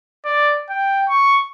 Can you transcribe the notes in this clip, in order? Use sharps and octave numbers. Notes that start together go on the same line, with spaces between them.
D5
G5
C#6